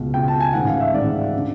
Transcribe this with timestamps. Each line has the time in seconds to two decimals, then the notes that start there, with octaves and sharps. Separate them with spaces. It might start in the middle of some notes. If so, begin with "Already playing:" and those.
Already playing: C#2 B2
0.14 C#2 B2 G5
0.28 A5
0.40 G#5
0.53 A1 G#2 D#3 F#5
0.67 F5
0.80 E5
0.93 A1 G#2 D#3 D5
1.37 D3